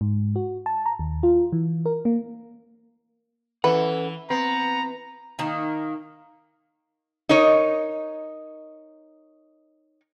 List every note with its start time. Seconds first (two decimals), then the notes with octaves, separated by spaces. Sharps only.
0.01 G#2
0.36 F#4
0.66 A5
0.86 A#5
0.99 D#2
1.23 F4
1.53 E3
1.86 A#4
2.05 A#3
3.64 E3 C#4 A4 B4 F#5
4.30 B3 C4 A#5
5.39 D#3 A#3
7.29 D#4 A#4 C#5 D#5